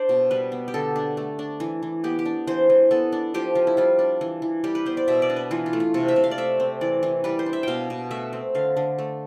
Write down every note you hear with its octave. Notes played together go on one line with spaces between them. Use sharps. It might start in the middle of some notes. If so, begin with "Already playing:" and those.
Already playing: D4 C5 D5
B2
G3 B4
B3
G4
D3 A4
D4
A3
D4
E3
E3
B3 G4
G4
D4
E3 C5
E3
B3 A4
D4
F3 G4
F3
E4
G3 F4
D4
E3
E3
G3 G4
B4
B3 C5
D5
B2 E5
D5
D4
B4
E3 F4
F4
A3
F4
C3 A4
E5
C3
F5
D5
A3 E5
C4
E3 D5
E3
G3 B4
C5
D4
E5
B2 F5 G5
B2
A3 E5
C4
D3 F5
D3
A3